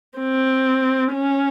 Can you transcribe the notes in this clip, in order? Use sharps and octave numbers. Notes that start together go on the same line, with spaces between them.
C4
C#4